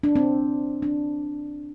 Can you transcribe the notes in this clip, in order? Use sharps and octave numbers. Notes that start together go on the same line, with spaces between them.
D4
C4
D4